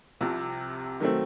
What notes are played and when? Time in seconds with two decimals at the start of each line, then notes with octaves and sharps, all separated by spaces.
0.21 C2 C3 F3
1.00 D#3 F#3 A3 C4